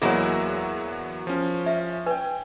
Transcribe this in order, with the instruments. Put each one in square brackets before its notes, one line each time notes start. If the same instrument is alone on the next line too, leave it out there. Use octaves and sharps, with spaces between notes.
[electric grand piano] E2 F#3 F#4 [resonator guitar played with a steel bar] G#3 A#3 E4 [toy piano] G#4 C#5
[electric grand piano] F3 C#4
[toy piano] E5
[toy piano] B4 [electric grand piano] G5 G#5